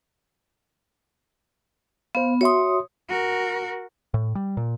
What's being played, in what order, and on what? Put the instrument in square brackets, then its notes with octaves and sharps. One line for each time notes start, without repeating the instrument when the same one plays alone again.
[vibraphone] B3 [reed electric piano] C5 F5
[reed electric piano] F#4 E5 C6 [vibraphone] C#5 D#6
[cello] F#4 A#4
[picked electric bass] A2
G3
A#2